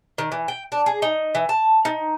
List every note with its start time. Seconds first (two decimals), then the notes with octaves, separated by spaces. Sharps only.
0.18 D#3
0.32 E3
0.48 G5
0.72 D4
0.86 G#4
1.02 D#4
1.35 E3
1.49 A5
1.85 D#4